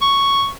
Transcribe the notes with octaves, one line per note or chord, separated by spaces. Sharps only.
C#6